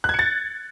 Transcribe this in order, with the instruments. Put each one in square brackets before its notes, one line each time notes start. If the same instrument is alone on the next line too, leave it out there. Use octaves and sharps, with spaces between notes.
[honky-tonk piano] F#6
G#6
C#7
A6